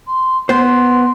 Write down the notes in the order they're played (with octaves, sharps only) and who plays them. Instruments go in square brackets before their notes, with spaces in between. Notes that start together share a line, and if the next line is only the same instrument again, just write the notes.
[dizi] C6
[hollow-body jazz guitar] B3 C5 [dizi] C6